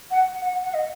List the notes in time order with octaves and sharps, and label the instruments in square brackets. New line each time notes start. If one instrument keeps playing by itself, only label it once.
[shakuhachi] F#5
F#5
F#5
D#5